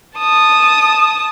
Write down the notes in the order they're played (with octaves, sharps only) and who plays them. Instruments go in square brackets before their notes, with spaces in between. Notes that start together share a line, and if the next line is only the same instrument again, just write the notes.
[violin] A5 D#6